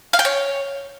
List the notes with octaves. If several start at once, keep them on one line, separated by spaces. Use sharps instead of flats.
F5
G5
C#5